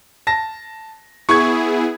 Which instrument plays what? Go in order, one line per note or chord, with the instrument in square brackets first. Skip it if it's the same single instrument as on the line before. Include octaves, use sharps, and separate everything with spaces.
[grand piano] A5 A#6
[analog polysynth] B3 E4 G#4 [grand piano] C#6 G#6